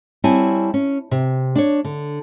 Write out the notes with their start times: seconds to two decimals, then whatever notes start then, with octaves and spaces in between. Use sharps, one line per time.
0.24 G3 C4 E4 C#5 G#5 A5
0.74 C#4
1.11 C3
1.56 D4 C#5
1.85 D3